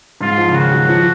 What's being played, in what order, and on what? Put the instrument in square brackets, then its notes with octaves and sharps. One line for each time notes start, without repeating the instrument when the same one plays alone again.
[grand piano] G#2 [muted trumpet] F4
[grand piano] F3
C#3
[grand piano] D#3 [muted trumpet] F#4
[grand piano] F#3
F3